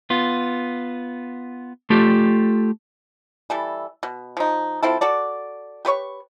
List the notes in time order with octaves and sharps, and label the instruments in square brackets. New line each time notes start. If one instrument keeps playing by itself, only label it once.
[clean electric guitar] B3 F4
A3 F4 G4 A4
[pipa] E3 G3 A4
B2
F3 D#4
F3 C4 E4 A4
F#4 A4 D5
G4 B4 C#5 C#6